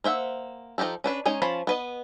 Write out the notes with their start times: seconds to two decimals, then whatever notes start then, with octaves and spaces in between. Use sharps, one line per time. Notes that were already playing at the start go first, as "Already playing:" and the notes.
0.04 A#3 C5 E5 F#5
0.78 F3 D#4 F#4 G4 A4
1.04 C#4 D4 B4
1.26 G#3 C#4 D#4 C#5
1.42 F3 C#4 F4 A5 B5
1.67 B3 B4 D#5